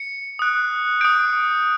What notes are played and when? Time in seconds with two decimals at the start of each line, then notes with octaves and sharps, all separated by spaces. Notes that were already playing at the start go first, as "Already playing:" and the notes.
Already playing: C#7
0.39 D#6 F#6
1.01 D#6 G6 D7